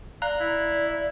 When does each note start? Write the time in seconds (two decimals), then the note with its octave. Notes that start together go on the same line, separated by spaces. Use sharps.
0.22 D5 F5 A#5 F#6
0.40 E4